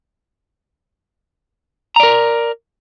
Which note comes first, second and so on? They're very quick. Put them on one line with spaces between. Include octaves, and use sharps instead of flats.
A#5 D5 A#4